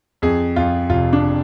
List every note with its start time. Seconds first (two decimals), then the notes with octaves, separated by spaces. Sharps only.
0.22 F2 G#4
0.56 F2 F4
0.90 F1 F4
1.13 D4